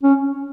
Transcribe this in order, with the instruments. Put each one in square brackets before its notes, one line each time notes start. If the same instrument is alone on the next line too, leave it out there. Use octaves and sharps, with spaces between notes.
[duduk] C#4